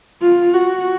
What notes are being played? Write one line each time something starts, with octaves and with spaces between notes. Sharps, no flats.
F4
F#4